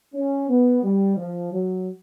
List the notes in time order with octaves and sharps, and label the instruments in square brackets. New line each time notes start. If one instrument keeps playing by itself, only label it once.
[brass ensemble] C#4
B3
G3
F3
F#3